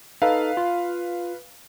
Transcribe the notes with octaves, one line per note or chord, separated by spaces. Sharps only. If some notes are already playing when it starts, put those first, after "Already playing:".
D#4 A4 B4 F5
F4